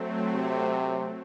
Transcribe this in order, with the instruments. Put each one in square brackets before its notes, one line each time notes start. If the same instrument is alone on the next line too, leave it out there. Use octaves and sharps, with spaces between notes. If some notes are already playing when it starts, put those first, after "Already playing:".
Already playing: [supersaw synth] F#3 A3 C4
[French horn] C3